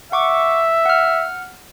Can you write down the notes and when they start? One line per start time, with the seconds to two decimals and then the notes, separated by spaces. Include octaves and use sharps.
0.12 E5 F#5 C#6 D6
0.86 F#5 F6